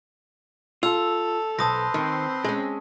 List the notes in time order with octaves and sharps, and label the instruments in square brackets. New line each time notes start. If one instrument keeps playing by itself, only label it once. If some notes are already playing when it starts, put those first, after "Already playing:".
[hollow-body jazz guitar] F4 [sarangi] A4 [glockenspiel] E6 F7
[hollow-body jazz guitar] B1 [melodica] B4 C5 C6 [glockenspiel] A5 D#6 A#6
[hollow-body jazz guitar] D#3 [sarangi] C4
[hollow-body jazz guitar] G#3 C#4